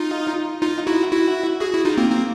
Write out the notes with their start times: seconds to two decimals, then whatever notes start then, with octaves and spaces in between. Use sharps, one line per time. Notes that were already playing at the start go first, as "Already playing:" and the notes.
Already playing: D#4 F4
0.62 D#4 F4
0.87 E4 F#4
1.12 E4 F#4
1.61 F#4 G#4
1.73 E4 F#4
1.85 D#4 F4
1.98 A#3 C4
2.10 A#3 C4